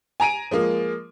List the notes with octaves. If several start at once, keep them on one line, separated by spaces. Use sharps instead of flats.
G#5 A#5 D7 D#7
F3 G#3 A#3